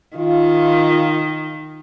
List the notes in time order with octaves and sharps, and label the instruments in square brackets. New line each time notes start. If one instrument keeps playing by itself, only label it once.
[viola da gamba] D#3 [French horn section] F4